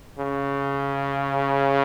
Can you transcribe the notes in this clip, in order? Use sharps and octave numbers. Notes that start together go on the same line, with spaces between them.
C#3